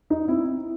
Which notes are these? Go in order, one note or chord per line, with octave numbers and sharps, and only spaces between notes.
D#4
C4 E4